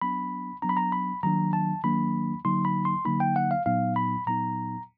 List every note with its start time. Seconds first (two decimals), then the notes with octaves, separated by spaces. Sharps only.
0.02 F#3 B3 D4 B5
0.62 F#3 B3 D4 A#5
0.69 B5
0.77 A#5
0.92 B5
1.23 D#3 F#3 A#3 D4 A#5
1.53 A5
1.84 D#3 F#3 A#3 D4 B5
2.45 D3 F#3 A#3 D#4 C6
2.65 B5
2.85 C6
3.05 D3 F#3 A#3 D#4 B5
3.20 G5
3.36 F#5
3.51 F5
3.66 A#2 F#3 B3 D#4 F5
3.96 B5
4.26 A#2 F#3 B3 D#4 A#5